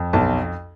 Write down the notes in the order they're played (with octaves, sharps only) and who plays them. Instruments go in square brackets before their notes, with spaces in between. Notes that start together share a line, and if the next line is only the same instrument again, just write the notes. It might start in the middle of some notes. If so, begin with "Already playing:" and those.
Already playing: [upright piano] F2
B1 A5